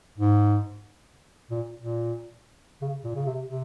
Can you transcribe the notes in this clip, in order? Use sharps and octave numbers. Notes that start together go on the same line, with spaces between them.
G#2
A#2
A#2
C#3
A#2
C#3
C3
C3